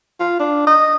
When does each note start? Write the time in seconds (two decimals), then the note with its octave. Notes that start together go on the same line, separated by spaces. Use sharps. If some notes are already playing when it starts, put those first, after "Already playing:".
0.20 F4
0.39 D4
0.67 D#5